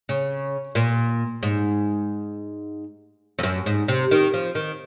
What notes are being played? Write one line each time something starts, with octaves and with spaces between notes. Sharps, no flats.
C#3
A#2
G#2
F2
F#2
G#2
C3
D#3
F3
D#3